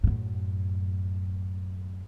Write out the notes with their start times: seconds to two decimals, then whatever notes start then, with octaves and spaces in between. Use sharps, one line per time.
0.04 F#2 A2